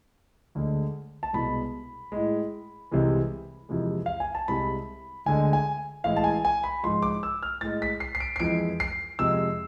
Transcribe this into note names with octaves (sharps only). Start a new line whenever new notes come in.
D2 D3 G#3
A5
C2 B2 G#3 B5
A2 G#3
C2 C3 E3 G#3
F2 C3 E3 G#3
F5
G#5
A5
C2 C3 G#3 B5
D2 D3 G#3 G#5
G#5
A2 E3 G#3 F5
A5
G#5
G#5
B5
G#2 F3 G#3 C6
D6
E6
F6
A2 G#3 A6
B6
C7
C7
D7
C7
F2 E3 G#3 D7
C7
F2 C3 G#3 E6